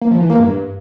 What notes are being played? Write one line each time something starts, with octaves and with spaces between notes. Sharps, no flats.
A#3
F3
E3
A#3
G2